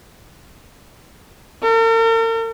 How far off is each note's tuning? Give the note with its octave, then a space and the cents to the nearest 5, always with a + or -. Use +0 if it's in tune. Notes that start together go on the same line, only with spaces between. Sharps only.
A#4 -45